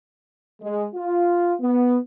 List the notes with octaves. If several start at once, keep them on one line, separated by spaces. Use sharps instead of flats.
G#3
F4
B3